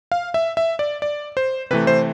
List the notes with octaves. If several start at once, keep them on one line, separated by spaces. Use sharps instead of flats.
F5
E5
E5
D5
D5
C5
C3 E3 A3 B4
C5